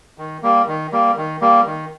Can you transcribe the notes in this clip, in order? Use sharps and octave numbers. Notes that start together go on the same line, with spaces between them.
D#3
G3 A#3
D#3
G3 A#3
D#3
G3 A#3
D#3